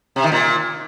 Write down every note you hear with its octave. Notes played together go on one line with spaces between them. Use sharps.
C3
D#3
A#2